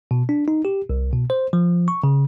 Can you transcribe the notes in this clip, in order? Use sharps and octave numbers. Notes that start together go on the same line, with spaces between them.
B2
D4
D#4
G4
C2
B2
C5
F3
C#6
C#3